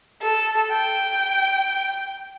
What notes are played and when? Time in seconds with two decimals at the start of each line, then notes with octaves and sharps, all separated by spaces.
0.22 A4
0.72 G5